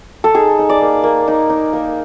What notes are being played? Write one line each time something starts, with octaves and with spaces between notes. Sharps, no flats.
A4
D#4 G#4
D#4
D5
A#3
A#3
D#4
D#4
A#3